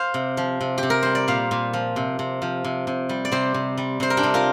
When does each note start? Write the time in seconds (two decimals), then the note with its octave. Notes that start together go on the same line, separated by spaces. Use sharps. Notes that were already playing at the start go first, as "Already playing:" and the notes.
Already playing: C5 F5
0.14 C3
0.37 F3
0.61 C3
0.78 G4
0.83 C3
0.90 A#4
1.03 G3 C5
1.15 D5
1.28 A#2 C5 F5
1.51 A#2
1.73 F3
1.96 C3
2.19 C3
2.42 F3
2.64 C3
2.87 C3
3.09 G3
3.25 D5
3.32 C3 G4 C5
3.54 C3
3.77 G3
4.00 C3 C5
4.10 A#4
4.17 D4 G4
4.23 C3
4.34 F4 A#4